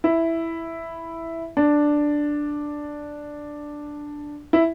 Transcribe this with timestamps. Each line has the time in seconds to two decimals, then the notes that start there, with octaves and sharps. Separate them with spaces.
0.04 E4
1.57 D4
4.53 E4